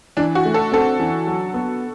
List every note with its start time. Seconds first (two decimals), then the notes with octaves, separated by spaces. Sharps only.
0.17 E3 D4
0.35 F#4
0.45 A3
0.54 A4
0.72 C4 A4
1.00 E3
1.27 F#3
1.54 B3